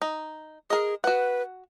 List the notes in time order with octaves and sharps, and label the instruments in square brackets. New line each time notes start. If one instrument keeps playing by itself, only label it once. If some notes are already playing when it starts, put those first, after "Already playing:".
[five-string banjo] D#4
[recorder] G#4 [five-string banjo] A#4 D#5
[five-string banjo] F#4 F#5 [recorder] B4